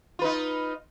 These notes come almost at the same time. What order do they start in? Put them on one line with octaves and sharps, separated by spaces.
F4 B4 D#4